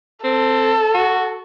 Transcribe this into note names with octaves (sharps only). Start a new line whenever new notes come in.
C4 A4
F#4